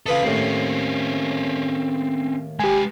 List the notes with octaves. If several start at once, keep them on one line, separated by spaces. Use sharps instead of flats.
C#3 F4 A4 B4 D#5
D#2 A2 C4 C#4
G#3 G4 B4 G#5